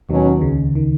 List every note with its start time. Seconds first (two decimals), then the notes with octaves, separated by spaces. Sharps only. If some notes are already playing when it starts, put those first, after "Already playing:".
0.09 D#2 B2 D#3 F#3 C#4
0.41 C#2 C#3
0.75 D#3